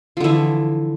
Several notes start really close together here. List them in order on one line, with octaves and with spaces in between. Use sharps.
F3 D3 E3